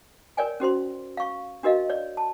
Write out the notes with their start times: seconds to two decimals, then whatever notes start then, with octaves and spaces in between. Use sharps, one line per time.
0.37 A#4 C#5 D5 G5 G#5
0.60 C#4 F#4 C5 C6
1.17 F5 C#6
1.63 D4 F#4 A#4 D#5 F5
1.89 C#5 D5
2.17 A5